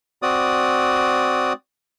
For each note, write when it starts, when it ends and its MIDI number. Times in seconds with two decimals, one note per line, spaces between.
0.22 1.53 60
0.22 1.53 66
0.22 1.53 74
0.22 1.53 87